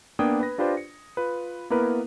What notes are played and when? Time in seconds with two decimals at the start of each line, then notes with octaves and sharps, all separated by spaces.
0.19 A#3 B3 D4 G5 D#6 G#6
0.40 B4 A#6
0.58 D4 F4 G4 B4 C5 D5
0.77 C#7
1.17 F4 B4
1.70 A#3 B3 E4 A#4 B4